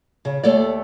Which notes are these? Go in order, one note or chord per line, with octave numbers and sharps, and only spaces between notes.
C#3
D#2 A3 A4 C#5 D5